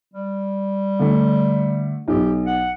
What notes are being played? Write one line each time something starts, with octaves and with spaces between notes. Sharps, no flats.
G3
D3 A3
B1 G4
F#5